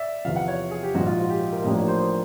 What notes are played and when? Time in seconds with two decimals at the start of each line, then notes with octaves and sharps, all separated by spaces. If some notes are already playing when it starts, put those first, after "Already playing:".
Already playing: D5 E5
0.25 E2 C3 F3 F5
0.36 F#5
0.48 C#5
0.71 G#4
0.83 G4
0.95 A#1 G#2 F3 F#4
1.06 F4
1.18 F#4
1.29 G4
1.52 A#4
1.64 A1 A2 F3 A#3 D4
1.76 C#5
1.88 C5
1.99 C5